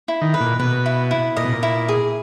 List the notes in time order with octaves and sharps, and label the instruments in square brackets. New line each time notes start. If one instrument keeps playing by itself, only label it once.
[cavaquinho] E4
[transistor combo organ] D#3
[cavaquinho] B4
[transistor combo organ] A#2
[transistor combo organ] B2 [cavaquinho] B4
[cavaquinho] E4
E4
[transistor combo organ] A#2 [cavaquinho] D#5
[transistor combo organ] B2
A#2
[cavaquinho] E4
G#4